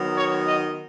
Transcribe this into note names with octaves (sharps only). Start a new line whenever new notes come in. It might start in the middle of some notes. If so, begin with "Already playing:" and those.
Already playing: D#3 F#3 B3
C#5
D#5